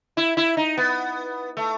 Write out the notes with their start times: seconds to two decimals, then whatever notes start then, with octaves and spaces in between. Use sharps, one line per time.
0.17 E4
0.37 E4
0.57 D#4
0.77 B3
1.57 A3